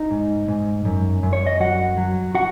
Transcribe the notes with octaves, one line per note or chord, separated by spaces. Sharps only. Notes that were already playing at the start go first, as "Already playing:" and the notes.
Already playing: D#4 D#5
G#2
G#2
F#2
F#2
C#5
D#5
F#3 F#4 F#5
F#3
F#4 F#5